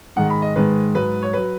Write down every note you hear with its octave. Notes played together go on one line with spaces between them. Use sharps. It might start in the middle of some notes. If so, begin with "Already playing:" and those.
G#2 D#3 G#3 F#5
B5
D#5
G#2 D#3 G#3 B4
G#2 F#3 B4
C#5
F#3 B4